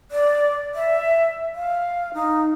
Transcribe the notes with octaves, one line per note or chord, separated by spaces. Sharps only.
D5
E5
F5
D#4